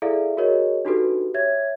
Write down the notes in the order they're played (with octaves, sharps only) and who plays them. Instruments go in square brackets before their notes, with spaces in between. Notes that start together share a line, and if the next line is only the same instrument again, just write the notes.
[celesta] E4 G#4 A4 D5 E5 F5
F#4 G#4 A#4 C#5 D#5
D4 D#4 F#4 G4 A4 B4
C#5 E5 G#6